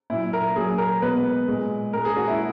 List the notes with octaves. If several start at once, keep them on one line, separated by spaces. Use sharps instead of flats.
A#2 F#3 E4
A#4
A#2 F#3 G#4
A#4
B2 G#3 B4
A#2 G#3
A#2 G#3 A#4
G#4
F#4
E4